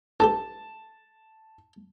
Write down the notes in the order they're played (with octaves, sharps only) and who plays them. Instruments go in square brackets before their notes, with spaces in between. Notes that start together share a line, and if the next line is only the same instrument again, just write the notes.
[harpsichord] G4 A4 A#4 [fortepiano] A5